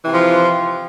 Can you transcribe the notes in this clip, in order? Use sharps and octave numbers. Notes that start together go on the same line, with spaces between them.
C3 E3 F3